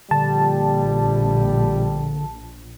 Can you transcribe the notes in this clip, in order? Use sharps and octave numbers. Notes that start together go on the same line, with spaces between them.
A#1 D3 G3 A5